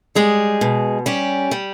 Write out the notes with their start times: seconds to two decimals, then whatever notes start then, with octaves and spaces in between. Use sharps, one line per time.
0.15 G3 G#3 G#4
0.61 B2
1.06 G3 C#4 G4
1.51 G3